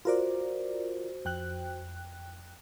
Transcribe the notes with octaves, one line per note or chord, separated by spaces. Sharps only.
F4 F#4 A#4 C5 D5
F2 G5 F#6